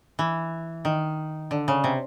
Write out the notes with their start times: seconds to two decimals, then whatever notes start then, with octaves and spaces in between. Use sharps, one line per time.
0.19 E3
0.85 D#3
1.51 D3
1.68 C#3
1.84 C3